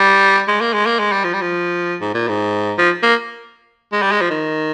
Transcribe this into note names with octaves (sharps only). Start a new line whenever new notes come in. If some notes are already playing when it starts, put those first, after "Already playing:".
Already playing: G3
G#3
A#3
G#3
A#3
G#3
G3
F3
G3
F3
G#2
A#2
G#2
F3
A#3
G#3
G3
G#3
F3
D#3